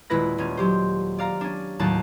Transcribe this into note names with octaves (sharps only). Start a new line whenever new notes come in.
D#1 G#3 E4 B4 A#6
D#1 C#4
F#3 G4 C5
D5 F5 A#5
C#4 D4
D#2 A2 F#3 A5 A6